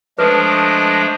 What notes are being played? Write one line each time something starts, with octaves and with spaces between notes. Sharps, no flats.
F3 G#3 A3 D4 B4 D#5 D6